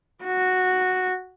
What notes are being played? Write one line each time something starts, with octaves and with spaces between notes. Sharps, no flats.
F#4